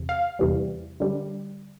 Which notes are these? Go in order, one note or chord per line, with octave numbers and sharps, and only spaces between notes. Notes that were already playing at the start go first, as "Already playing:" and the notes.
Already playing: E2 C3
F5
E2 C3 E3 G3
D3 G3